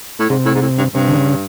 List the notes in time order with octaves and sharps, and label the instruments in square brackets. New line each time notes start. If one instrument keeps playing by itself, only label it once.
[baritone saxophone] A2
[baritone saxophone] G#2 [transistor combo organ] C3
[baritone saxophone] A2
G#2
A2
G2
[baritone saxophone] G2 [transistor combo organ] C3
[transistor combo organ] D3
C#3